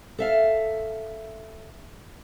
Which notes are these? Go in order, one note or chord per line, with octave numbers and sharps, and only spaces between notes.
A4 E5 F5